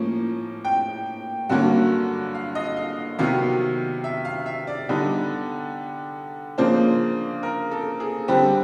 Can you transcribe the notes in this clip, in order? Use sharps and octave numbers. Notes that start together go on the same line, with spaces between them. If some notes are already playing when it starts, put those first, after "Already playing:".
Already playing: A2 F3 A#3 C#4
G5
G2 D3 F#3 A#3 C#4 F#5
F5
D#5
F5
C3 D#3 F#3 B3 F5
E5
F5
E5
D5
D3 G3 B3 D#4
C#3 F3 A#3 D4 C5
A#4
A4
G#4
D3 G3 C4 G4